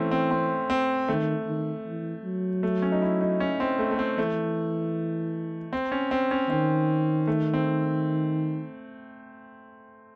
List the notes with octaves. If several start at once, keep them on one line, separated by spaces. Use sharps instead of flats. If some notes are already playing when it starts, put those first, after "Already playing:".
Already playing: E3 A3 C4 C#4
C4
C4
C4
D#3 A3
D#3
E3
F#3
A3
C#4
D#4
E4
D#4
C#4
C4
A3
A3
C4
E3 A3
C4
C#4
C4
C#4
D#3 C4
A3
C4